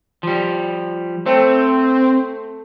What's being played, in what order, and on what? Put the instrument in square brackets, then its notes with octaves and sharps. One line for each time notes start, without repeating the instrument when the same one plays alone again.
[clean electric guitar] F3 G3
[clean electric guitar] A3 [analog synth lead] C4